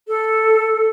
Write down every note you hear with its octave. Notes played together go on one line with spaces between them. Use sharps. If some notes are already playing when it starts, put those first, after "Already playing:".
A4